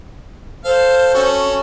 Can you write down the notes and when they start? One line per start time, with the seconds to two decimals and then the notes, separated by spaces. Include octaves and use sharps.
0.65 A4 C5 F5
1.14 C#4 F#4 A4